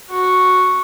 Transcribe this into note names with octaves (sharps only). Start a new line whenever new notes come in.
F#4